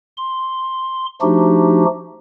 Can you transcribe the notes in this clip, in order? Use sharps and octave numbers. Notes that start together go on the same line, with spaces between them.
C6
F3 A3 D4 D#4 F#4 G4